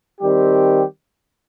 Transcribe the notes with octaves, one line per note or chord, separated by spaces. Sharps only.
D#3 G3 C4 G4